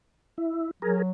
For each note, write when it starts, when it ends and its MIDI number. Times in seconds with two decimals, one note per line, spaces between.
0.38 0.71 64
0.82 1.12 54
0.82 1.02 68
0.82 1.02 70